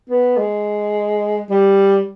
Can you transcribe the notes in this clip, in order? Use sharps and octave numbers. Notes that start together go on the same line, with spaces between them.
B3
G#3
G3